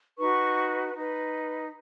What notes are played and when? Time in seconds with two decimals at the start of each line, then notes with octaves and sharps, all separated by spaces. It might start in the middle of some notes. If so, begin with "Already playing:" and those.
0.19 D#4 F#4 B4 C#6
0.94 D#4 B4